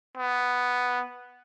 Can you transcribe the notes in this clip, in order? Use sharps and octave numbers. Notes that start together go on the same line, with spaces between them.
B3